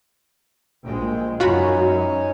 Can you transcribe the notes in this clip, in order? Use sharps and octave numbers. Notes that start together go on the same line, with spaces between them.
A#1 A#2 G#3 G5
F#2 C#4 D#4 F4 F#4 C#5 B5